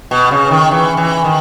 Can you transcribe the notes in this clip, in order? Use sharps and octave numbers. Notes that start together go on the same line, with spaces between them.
B2
C#3
D#3
E3
E3
D#3